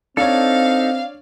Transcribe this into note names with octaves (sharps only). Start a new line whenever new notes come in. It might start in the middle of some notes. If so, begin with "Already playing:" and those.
C4 D4 D#4 A4 C#5 F5